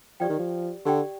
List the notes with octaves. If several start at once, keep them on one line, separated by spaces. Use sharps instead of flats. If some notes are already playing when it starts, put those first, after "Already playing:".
F3 G4 D5 G5
D#3
F3
D3 G4 D5 G5